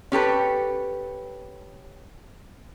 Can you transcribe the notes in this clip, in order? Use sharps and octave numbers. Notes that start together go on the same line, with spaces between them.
C#4 G4 A4 B4